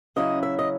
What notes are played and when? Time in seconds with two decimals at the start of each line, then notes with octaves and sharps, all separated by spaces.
0.16 C#3 F#3 C#4 E4 D#5
0.43 E5
0.59 D#5